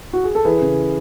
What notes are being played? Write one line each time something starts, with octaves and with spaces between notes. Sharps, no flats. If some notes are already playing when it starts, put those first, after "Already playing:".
F#4
G#4
A4
E3 G#4 B4
C#3